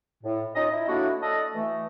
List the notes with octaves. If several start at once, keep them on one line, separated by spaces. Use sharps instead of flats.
A2
C#4 D#4 F4 D#5
E4
F#3 A3 A#3 D4 E4 F#4
A4 D5 D#5
E3 A3